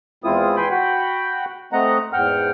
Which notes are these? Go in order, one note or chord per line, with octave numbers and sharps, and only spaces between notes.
E2 G#3 C4 E4 F4 D#6
B4 G5 G#5 B5 C6
F#4 F#5 G5 B5
A3 C4 D#5 F#5 A#5
E2 G#2 F#5 G5 F6